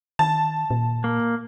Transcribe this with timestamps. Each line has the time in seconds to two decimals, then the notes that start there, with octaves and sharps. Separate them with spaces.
0.19 D#3 A5
0.70 A#2
1.04 A#3